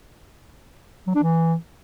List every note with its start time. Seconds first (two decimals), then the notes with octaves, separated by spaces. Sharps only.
1.07 F#3
1.15 D4
1.23 E3